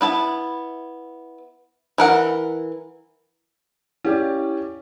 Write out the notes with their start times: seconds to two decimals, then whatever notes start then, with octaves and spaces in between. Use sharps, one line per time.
0.01 B3 E4 A5
1.98 E3 A#4 F#5
4.05 C#4 E4 G4 D5